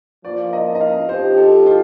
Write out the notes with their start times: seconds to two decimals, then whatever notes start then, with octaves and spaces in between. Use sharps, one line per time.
0.25 F3 A#3 F4 D5
0.53 D#5
0.75 D#5
0.81 F5
1.09 F3 C4 D#4 G4 C5
1.38 A4
1.66 F4